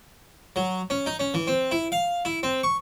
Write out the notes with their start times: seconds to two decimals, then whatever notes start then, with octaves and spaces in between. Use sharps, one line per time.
0.56 F#3
0.90 C#4
1.06 D#4
1.19 C#4
1.34 E3
1.47 C4
1.71 E4
1.92 F5
2.25 E4
2.43 C4
2.63 C#6